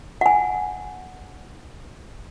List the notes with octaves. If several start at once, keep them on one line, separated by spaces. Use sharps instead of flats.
F#5 G#5